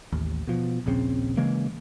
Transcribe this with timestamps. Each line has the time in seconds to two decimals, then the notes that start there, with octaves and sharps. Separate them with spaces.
0.12 A1 D#2
0.47 B2 F3
0.86 D#1 A#1 C#3 C4
1.37 C#3 E3 G#3 A#3